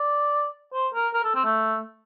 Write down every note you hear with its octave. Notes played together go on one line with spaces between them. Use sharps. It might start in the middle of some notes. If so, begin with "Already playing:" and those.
Already playing: D5
C5
A#4
A#4
A4
C4
A3